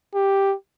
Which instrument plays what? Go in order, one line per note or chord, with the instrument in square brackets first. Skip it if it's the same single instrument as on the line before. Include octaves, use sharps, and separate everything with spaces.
[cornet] G4